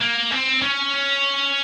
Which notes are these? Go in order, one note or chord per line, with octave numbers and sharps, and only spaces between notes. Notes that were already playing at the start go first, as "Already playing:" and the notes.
A#3
C4
C#4